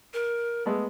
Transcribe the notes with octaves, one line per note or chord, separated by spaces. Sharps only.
A#4
G#3 A3 B3